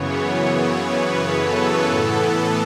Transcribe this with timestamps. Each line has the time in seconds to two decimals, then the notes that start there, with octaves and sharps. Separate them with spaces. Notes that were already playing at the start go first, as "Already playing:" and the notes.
Already playing: F#2 C#3 E3 B3 C#5
0.85 B4
1.37 A4
1.88 A2 E3 B3